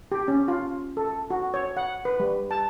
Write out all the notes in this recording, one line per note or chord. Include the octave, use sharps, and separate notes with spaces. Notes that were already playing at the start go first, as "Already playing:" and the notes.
G4
C#4
F4
A4
F#4
C#5
F#5
B4
G3
A5